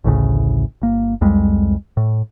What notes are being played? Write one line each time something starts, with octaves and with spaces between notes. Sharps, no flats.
A1 D2 A2 C#3
G1 A#3
C2 F2 G3 G#3
A2